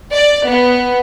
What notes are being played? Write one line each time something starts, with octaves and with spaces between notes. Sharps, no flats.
D5
B3